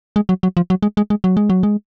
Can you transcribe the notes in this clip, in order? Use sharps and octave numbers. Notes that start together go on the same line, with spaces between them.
G#3
F#3
F#3
F3
F#3
G#3
G#3
G#3
F#3
G#3
F#3
G#3